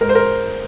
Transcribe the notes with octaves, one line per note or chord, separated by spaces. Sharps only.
G#2 A#4
C5
A#4